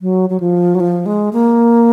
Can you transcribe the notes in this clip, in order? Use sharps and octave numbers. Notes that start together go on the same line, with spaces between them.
F#3
F#3
F3
F#3
F3
G#3
A#3